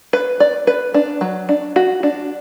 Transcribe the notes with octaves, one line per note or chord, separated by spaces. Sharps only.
B4
D5
B4
D4
F#3
D4
F#4
D4